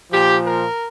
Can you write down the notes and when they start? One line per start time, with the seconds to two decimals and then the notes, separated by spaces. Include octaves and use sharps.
0.12 A#2 F3 G4
0.46 A#4